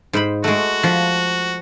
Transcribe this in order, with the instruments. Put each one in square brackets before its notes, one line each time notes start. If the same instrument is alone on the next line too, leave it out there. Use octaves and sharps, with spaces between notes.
[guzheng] G#2 C5 B5
[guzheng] G#3 A3 [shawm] F#4
[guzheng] F3